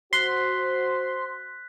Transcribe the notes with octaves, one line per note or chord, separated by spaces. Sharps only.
F#4 C5 C6 F#6 B6